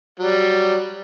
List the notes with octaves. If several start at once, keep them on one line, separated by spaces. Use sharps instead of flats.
F#3 G3